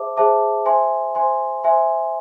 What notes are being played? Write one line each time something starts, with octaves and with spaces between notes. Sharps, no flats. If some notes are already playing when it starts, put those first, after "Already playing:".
Already playing: G#4 C5 E5 A5 D6
G#4 C5 E5 A5 D6
C5 E5 G#5 C6
C5 E5 G#5 C6
C5 E5 G#5 C6